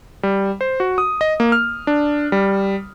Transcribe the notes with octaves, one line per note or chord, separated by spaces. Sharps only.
G3
C5
F#4
D#6
D#5
A#3
F6
D4
G3